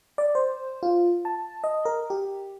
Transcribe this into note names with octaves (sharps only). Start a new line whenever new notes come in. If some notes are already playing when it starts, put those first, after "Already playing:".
D5
C5
F4
A5
D#5
A#4
G4